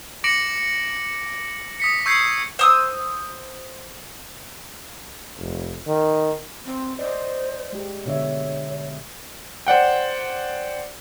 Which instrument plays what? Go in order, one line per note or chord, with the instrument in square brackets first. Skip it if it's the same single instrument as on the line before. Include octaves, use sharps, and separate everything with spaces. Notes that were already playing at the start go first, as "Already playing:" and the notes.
[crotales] D6 A#6 C#7 D7 F#7
D#6 B6 C#7
C#6 E6 G6 G#6 C7 C#7
[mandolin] C5 D#6 E6
[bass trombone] F1
D#3
[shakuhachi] C4
[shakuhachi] C5 [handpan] D5 D#5
[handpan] G#3 G4
[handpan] B2 D3 E5 [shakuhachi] C#5
[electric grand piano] C5 D5 F#5 G5